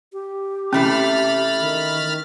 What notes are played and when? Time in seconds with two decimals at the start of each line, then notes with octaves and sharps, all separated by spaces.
0.13 G4
0.73 C3 E3 A3 C#4 B5 F6 A6
1.61 D#3